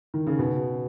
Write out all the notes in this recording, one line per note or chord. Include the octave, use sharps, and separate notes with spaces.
D#3
C#3
B2